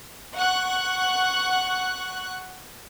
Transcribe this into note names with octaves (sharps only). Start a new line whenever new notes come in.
F#5 C#6 F#6